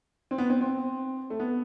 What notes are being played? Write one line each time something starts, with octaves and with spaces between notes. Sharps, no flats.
C4
B3
C4
C4
A3
B3